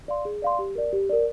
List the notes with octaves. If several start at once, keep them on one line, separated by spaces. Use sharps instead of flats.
D5 F5 C6
G#4
D5 F5 C6
G4
A#4 D5
G4
A#4 D5